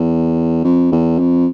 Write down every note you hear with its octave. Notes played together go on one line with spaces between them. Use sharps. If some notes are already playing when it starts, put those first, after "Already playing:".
Already playing: E2
F2
E2
F2